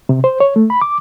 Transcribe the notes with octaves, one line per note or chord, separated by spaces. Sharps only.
C3
C5
C#5
A3
B5
D6